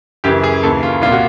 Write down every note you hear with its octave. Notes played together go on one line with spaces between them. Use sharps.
F#2 C#3 E3 G4
G#4
D#2 C#3 E3 A4
F4
C2 A#2 F4
F#4